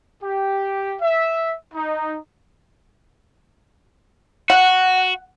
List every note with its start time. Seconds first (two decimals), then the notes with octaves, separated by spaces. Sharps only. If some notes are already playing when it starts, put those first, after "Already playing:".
0.23 G4
1.02 E5
1.75 D#4
4.50 F#4 F#5